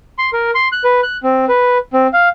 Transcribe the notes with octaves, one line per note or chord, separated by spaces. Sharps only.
C6
A#4
C6
F#6
B4
F#6
C4
B4
C4
F5